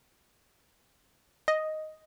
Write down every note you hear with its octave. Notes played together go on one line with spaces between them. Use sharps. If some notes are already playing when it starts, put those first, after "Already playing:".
D#5